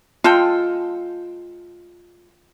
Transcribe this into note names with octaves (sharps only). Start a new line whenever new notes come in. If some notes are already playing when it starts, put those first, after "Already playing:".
G#3 F4 A4 G5